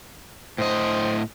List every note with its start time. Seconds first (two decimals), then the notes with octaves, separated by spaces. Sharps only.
0.58 A2 C5 D#5